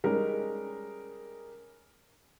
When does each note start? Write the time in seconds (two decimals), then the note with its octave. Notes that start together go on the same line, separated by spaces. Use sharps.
0.04 G3 G#3 C#4 D#4 A#4